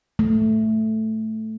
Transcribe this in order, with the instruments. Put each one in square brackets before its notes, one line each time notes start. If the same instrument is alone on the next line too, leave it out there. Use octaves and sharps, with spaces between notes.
[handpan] A3